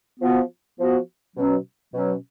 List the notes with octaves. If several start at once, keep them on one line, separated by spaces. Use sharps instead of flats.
F3 B3 F#4
F3 B3 F#4
B2 F#3 C#4
B2 F#3 C#4